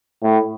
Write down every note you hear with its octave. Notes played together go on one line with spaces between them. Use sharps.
A2